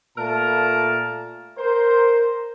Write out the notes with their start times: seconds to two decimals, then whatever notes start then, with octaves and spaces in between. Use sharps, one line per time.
0.15 A#2 A3 A#4 A5
1.56 A#4 C5